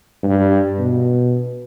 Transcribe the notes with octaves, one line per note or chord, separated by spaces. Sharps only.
G2
B2